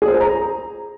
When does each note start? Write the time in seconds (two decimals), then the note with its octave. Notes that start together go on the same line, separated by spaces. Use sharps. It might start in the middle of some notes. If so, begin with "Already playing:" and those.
0.02 G#4
0.08 C5
0.14 G#4
0.21 A#5